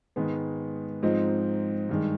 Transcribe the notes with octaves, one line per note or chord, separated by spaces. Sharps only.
G#2 D#3 G#3 B3
G#2 F3 C4 D#4
G2 D#3 G#3